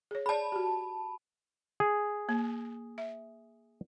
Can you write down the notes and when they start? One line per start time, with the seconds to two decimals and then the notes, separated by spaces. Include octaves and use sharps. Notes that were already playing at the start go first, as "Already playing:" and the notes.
0.11 G#4 C#5
0.26 G#4 D5 A5 B5
0.52 F#4 G4
1.80 G#4
2.29 A#3
2.98 E5